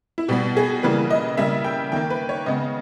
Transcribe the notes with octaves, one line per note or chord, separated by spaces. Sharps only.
E4
B2 G3 B3 G4
G#4
C#3 E3 G3 A#3 B4
D#5
C#3 G3 A#3 E5
G5
D#3 A#3 G5
B4
C#5
C#3 G#3 B3 D#5